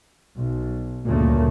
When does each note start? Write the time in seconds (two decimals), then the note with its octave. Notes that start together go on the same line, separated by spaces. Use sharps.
0.35 B1
1.06 D2 G2 A#2 C#3 A3 A#3